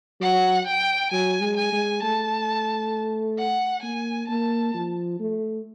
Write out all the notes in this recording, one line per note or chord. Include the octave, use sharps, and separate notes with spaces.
F#3 F#5
G5
F#3 G#5
G#3
G#5
G#3
A3 A5
F#5
A#3 G#5
A#3 A5
F3
A3